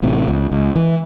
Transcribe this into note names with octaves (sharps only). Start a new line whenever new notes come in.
A1 A2 C3
C#2
C#2
E3